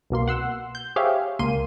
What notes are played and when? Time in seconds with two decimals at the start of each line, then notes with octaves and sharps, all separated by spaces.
0.10 C2 B2 A#3 C6
0.28 F#5 C6 E6
0.75 G6
0.96 G4 G#4 C5 C#5 E5 F5
1.39 C#2 A#3 C6 D#7